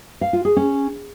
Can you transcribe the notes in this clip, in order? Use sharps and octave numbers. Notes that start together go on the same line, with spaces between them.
F5
F4
G#4
C#4